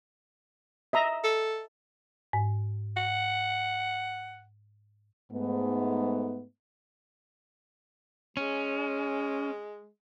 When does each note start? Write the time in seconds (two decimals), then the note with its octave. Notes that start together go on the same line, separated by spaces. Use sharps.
0.93 D#5 E5 A#5
1.24 A4
2.33 G#2
2.97 F#5
5.32 G#2 A3 B3
8.37 G#3 C#4